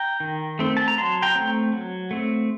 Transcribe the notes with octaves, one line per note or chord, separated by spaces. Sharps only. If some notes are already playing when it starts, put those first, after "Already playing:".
Already playing: G5 A#5
D#3
A3 C4
A5
A#5
F#3 A5 C6
G5 A#5
A3 C4
F#3
A3 C4